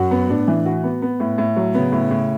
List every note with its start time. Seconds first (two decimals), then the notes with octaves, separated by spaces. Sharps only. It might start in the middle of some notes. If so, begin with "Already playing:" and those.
Already playing: F#2 F#4
0.11 B3
0.29 A2 D4
0.48 E3
0.66 F#4
0.84 B3
1.02 B3
1.20 A2
1.38 A2
1.56 F#3
1.74 C#3 B3
1.92 A2
2.11 A2